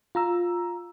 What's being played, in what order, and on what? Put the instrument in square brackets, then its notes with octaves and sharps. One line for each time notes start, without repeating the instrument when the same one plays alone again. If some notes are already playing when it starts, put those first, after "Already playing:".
[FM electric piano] F4 A#5 E6